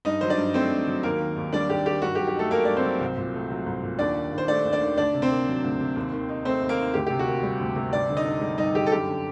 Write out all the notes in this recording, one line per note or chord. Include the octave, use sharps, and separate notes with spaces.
G2 D#4 D#5
F#3 C5
D4 D5
G2
A3 C4 C5
G2
F#3
D#2 A#3 A#4
D#3
D#2
G3 D4 D5
D#2 G4
D#3 G4
G2 F#4
G4
F#3
G4
A3 D#4 A4
A3 A#3 A#4
G2 D5
C4 C5
F#3
C2
A#2
A3
F#3
C2
A#2
D#2 D4 D5
D#3
D#2
C5
A3 D4 D5
D#2
D4 D5
D#3
D2 D4 D5
C3
C4 C5
A#3
F#3
D2
C3
D#2
D#3
D#4
A3 C4 C5
D#2
A#3 A#4
D#3
D2 G4
C3 G4
F#4
A#3
G3
D2
C3
G2 D4 D5
D3
D#4 D#5
D4
G3
G2 D#4 D#5
D3 G4
A4
F#2 G4
D3